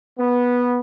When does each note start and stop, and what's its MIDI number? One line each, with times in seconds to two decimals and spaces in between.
0.18 0.79 59